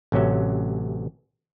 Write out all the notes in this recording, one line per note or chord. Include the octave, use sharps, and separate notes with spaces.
A1 C3 F#3 C#4 E5